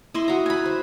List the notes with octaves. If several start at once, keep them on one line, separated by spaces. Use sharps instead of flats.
E4 D#5 C6
F#4 A#5
G#5 B5
C5